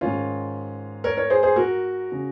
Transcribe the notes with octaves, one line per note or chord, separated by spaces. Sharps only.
G#2 D#3 C#4 F4
A#4 C#5
A#4 C#5
G#4 C5
G#4 C5
F#4 A#4
C#3